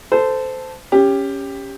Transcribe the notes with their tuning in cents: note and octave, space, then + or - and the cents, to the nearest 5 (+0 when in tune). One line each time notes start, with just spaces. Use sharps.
A4 +0 C5 -20
C#4 +0 G4 +10